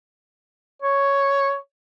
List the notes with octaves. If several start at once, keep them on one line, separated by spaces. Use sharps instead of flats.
C#5